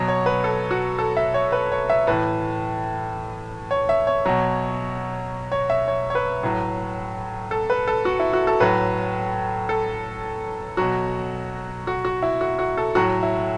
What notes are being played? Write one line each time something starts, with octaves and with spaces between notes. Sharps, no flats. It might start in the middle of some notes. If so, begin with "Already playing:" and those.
Already playing: B2 F#3
C#5
B4
A4
F#4
A4
E5
C#5
B4
C#5
E5
A2 E3 B4
C#5
E5
C#5
B2 F#3
C#5
E5
C#5
C#5
B4
A2 F#3
A4
B4
A4
F#4
E4
F#4
A4
A2 F#3 B4
A4
B2 F#3 F#4
F#4
F#4
E4
F#4
F#4
A4
A2 F#3 F#4
E4